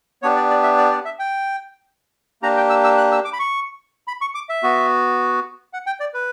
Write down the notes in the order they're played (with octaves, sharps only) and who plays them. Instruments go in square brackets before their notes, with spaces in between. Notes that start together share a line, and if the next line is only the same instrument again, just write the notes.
[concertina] B3 D4 G4 C#5
D5
D5
E5
D5
D5
E5
G5
A#3 D4 G4 A#5
G5
E6
E6
F#6
E6
D6
B5
C#6
B5
C#6
D6
E5
B3 F#4
F#5
G5
D5
B4